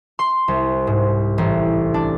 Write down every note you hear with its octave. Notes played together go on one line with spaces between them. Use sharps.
C6
C2
G#2
A1
D4